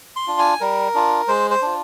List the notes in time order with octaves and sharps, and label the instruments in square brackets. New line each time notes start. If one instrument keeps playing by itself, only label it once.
[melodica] C6
D4 F4
G#5
G3 A#4
D4 F4
G#3 C5
C5
D4 F4